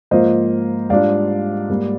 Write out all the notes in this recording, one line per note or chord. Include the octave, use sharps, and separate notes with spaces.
G#2 F3 A#3 F4 C5 D#5
G#2 G3 D4 F4 D5 F5
G#2 G3 A#3